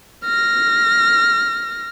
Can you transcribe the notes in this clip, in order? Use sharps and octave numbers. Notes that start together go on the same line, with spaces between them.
F6 A#6